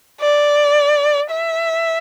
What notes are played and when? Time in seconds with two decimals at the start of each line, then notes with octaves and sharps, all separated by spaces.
0.21 D5
1.31 E5